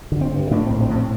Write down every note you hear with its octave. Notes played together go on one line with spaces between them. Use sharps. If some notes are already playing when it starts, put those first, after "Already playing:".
D3
C4
G2
A2 D4
C4
A#1
C4
A2
C4